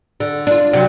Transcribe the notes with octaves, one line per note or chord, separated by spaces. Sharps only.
D3
D4 F4
C3 F#3